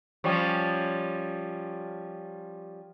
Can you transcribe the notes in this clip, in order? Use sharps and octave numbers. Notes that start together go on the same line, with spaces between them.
F3 G3 C#4